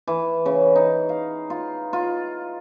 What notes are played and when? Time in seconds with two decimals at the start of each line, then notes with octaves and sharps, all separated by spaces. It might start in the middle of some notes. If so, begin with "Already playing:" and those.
0.07 E3
0.46 C#3
0.75 D#4
1.09 F5
1.50 F4
1.93 F4